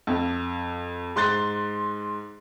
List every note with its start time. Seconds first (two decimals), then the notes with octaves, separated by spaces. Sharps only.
0.07 F2
1.16 G#2 C6 F#6 A6